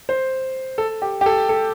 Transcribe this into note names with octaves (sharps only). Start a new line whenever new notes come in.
C5
A4
G4
G4
A4
A4